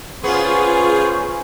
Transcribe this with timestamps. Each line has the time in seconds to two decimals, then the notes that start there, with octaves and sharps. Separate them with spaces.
0.24 B3 C#4 F4 G#4 C5 C#6